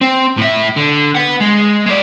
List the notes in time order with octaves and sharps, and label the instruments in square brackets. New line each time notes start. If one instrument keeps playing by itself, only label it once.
[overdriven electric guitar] C4
A2 E5
D3
B3 F#5
G#3
G#3 D5